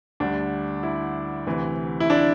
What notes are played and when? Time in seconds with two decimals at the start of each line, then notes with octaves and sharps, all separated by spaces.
0.20 D2 D3 G3 D4
0.83 E4
1.47 D2 C3 E3
2.00 E4
2.10 D4